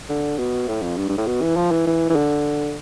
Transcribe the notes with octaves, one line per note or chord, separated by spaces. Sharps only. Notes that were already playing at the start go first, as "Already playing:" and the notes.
D3
B2
A2
F2
G2
G2
A2
B2
E3
F3
E3
E3
E3
D3